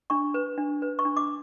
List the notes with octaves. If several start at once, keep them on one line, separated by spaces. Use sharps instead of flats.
D4 C#6
B4
D4
B4
C#6
D4
D6